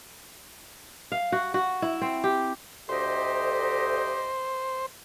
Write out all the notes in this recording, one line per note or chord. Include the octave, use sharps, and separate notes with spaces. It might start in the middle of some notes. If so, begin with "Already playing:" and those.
F5
F#4
F#4
E4
C4
G4
D2 G4 C5 D#5